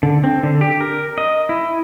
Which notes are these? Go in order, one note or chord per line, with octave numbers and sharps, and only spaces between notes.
D3
C4
D3
G4
A#4
D#5
E4